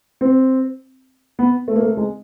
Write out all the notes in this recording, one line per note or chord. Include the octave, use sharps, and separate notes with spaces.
C4
B3
A3
A#3
A3
G#3